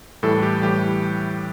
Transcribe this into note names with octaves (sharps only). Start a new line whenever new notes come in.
A2 E3 G3 A4
G4
A2 E3 G3 G4